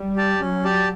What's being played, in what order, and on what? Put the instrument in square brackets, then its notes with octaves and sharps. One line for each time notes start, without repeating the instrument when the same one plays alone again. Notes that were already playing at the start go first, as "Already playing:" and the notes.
Already playing: [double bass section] G3
[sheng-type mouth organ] G4 D5 A5
[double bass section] F#3 [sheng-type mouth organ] C#4
[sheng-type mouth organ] G4 D5 A5